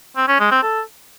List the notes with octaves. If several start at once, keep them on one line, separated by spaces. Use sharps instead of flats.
C4
C#4
G#3
C4
A4